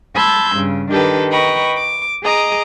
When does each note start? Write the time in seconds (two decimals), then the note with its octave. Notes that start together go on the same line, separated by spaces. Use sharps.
0.14 A5 B5 C6 E6 G6 G#6
0.54 G2 C#3
0.90 D#3 D4 G4 A4 B4
1.30 B4 D#5 G5 A#5 B5 C#6
1.75 D6
2.22 G#4 D#5 A#5 D6